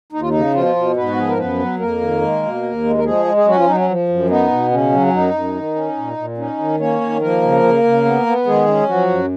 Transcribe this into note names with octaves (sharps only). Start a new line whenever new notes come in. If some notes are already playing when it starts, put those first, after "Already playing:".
D#2 D#4
F4
C#3 D#4
B2 F3 F4
B2
G#2 B3 B4
F#4
F3 G#4
A#4
F#2 B3 B4
F#3
F2 A#3 A#4
D#3
G#3
B2
D#2
G#3
A#4
F3 G#3 G#4
G#3
G#4
F#3 C#4 F#4
F3 F4
F#3 D#4
C#4
F3
F#2
B3 D#4
B2
C#3 C#4
F#3
C#4
F#2 D#4
F#2
D#3
C#4
A#2
A#2
C#4 D#4
D#3
A#3 C#4 C#5
D#3
F3 A#3 A#4
C#3
C#3
C#3
B3
B3
D#3 G#3 G#4
C#4
F3 F#3 F#4
F#2